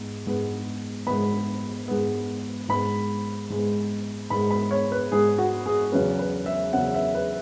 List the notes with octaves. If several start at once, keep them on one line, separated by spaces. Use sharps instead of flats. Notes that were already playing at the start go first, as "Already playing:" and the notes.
Already playing: G#2 B3
G#2 G#3 B3
G#2 G#3 B3 B5
G#2 G#3 B3
G#2 G#3 B3 B5
G#2 G#3 B3
G#2 G#3 B3 B5
B5
C#5
B4
G#2 G#3 B3 G#4
F#4
G#4
E2 C#3 F#3 C#4 B4
B4
E5
E2 C#3 F#3 C#4 F#5
E5
B4